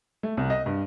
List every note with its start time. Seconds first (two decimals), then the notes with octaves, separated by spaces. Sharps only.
0.23 A3
0.37 C2
0.50 D#5
0.66 G2